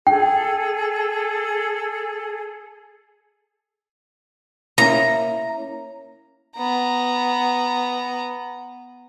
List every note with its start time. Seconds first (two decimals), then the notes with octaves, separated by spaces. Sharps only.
0.07 G#4 A4 G5
4.78 A#3 C#4 E4 A#5
6.57 B3 A#5